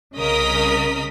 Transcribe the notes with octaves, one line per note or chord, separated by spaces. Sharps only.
C2 C#3 A#4 D#5 D#6 B6